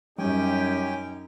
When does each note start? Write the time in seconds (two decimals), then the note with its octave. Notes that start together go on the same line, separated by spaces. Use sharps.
0.19 F#2 G3 C#4 D#4 G4 G5 G#5